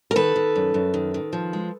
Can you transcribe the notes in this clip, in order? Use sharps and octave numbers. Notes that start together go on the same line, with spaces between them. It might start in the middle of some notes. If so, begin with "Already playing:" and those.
A#4
D#3 A4 B4
D#3
F#2
F#2
D#3
D#3
F3
G#3